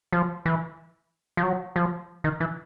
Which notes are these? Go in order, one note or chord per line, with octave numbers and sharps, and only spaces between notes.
F3
E3
F3
F#3
F3
D#3
E3